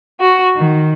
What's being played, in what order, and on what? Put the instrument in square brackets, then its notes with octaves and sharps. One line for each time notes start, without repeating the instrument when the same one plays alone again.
[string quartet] F#4
D#3